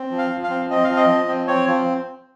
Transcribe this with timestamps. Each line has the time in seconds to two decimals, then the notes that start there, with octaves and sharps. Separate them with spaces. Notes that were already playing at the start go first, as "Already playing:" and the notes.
Already playing: C4
0.11 F3
0.19 F5
0.31 F3
0.44 F5
0.50 C4
0.70 C4 D#5
0.84 F5
0.89 F3
0.97 D#5
1.08 F3
1.28 C4
1.48 C4 C#5
1.67 F3